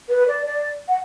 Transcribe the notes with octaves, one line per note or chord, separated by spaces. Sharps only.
B4
D5
D5
F#5